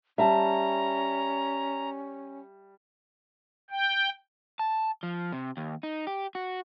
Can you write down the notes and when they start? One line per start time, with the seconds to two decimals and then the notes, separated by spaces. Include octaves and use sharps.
0.18 G3 C#4 E5 A5 A#5
3.71 G5
4.59 A5
5.03 F3
5.33 C3
5.57 D#2
5.83 D#4
6.07 G4
6.35 F#4